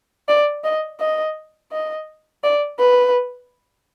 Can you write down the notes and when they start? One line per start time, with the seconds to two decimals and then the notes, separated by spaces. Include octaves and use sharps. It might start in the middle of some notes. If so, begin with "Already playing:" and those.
0.28 D5
0.64 D#5
1.00 D#5
1.72 D#5
2.44 D5
2.79 B4